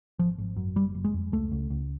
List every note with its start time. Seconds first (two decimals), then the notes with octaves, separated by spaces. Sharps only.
0.19 G#1 F3
0.38 G#1
0.56 F#2
0.76 F#1 G3
0.95 F#1
1.04 G#3
1.14 F2
1.32 C#2 A3
1.52 C#2
1.70 C#2